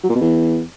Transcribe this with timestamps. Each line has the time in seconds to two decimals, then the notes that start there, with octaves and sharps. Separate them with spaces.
0.04 F#3
0.09 A#2
0.15 B2
0.21 E2